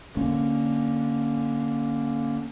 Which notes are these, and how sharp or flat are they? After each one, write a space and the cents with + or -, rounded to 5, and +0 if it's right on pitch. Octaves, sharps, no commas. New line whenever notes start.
D3 +0 A#3 +0 C#4 +0